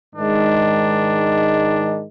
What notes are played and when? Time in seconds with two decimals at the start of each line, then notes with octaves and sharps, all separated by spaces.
0.14 G#2 D#3 G#3 D4